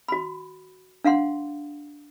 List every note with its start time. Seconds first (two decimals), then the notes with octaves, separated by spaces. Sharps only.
0.08 F#4 B5
1.04 D4 F5 F#5 C6